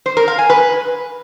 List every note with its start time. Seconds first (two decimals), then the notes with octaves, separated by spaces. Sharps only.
0.06 C5
0.17 A#4
0.28 F5
0.39 G#5
0.50 B4